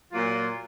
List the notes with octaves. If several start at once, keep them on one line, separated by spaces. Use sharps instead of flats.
A#2 F#3 A#3 F4